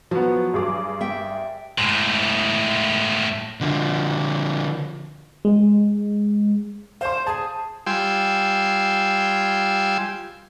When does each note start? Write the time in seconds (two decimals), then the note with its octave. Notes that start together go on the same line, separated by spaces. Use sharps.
0.11 F3 F#3 B3
0.54 G2 G#4 D6
1.01 E5 G5
1.78 A2 G#3
3.61 D3 F3
5.45 G#3
7.01 C5 F5 C6
7.27 G#4 A5
7.87 G3 F4 G5 G#5 C6 E6